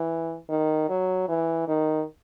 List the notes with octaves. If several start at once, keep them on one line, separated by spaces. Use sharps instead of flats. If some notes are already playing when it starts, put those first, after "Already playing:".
Already playing: E3
D#3
F#3
E3
D#3